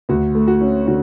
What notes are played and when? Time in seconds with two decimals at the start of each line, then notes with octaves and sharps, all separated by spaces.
0.09 D2 F#4
0.35 A3
0.47 F#4
0.61 C#4
0.87 D3 F#4